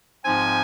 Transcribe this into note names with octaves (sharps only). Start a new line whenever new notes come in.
G#2 F3 C4 G#5